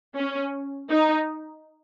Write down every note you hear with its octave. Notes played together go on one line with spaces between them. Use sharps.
C#4
D#4